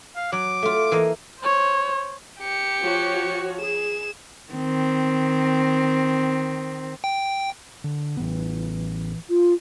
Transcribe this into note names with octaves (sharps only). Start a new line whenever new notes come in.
F5
F#3 D6
A3 F4
E3 A#3 D#5
C5 C#5
G4 C#7
F3 F#4 C#5
G#4 E7
D#3 C4
G5
D3
A1 E3 B3
F4